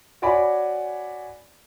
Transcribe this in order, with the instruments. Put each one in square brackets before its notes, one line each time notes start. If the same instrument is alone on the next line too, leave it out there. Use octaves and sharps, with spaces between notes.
[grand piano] F#4 C#5 D5 G#5 B5